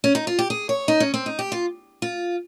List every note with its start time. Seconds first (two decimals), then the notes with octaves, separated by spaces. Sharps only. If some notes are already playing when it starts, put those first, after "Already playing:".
0.04 C#4
0.15 D#4
0.27 F4
0.39 G4
0.50 G#4
0.69 C#5
0.88 D#4
1.00 C#4
1.14 C4
1.26 D#4
1.39 G4
1.52 F4
2.02 F4